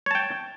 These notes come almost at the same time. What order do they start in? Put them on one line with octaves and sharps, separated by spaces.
C#5 A5 G5